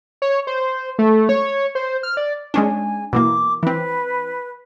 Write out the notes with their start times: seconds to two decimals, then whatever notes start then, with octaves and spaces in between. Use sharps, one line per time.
0.22 C#5
0.47 C5
0.99 A3
1.29 C#5
1.75 C5
2.03 F6
2.17 D5
2.54 G#3 C#4 D4 G#5
3.13 B2 E3 A#3 D6
3.63 E3 C4 B4